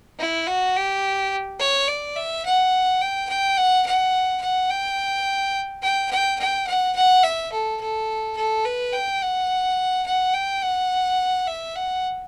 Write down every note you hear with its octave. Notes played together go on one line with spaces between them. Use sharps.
E4
F#4
G4
C#5
D5
E5
F#5
G5
G5
F#5
F#5
F#5
G5
G5
G5
G5
F#5
F#5
E5
A4
A4
A4
B4
G5
F#5
F#5
G5
F#5
E5
F#5